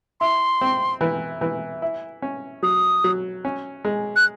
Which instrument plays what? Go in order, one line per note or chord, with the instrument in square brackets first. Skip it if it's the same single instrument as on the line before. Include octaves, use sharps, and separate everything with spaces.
[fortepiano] E4 [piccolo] C6
[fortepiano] C4
E3
E3
E4
C#4
[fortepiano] F#3 [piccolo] D#6
[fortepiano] F#3
C#4
G#3
[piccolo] F#6